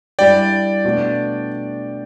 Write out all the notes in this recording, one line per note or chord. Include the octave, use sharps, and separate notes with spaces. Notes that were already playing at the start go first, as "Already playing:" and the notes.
G2 G3 E4 D5 G5
B2 A3 D4